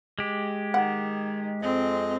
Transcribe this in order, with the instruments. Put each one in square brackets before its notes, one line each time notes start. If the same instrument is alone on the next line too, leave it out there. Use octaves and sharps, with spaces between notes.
[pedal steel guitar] G#3 G4
[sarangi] D#3 [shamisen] F#5
[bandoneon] F2 G#3 D#5 [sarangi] C4